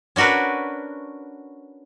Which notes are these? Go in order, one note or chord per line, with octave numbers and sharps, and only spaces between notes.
C#4 D4 F#4 A#4 B4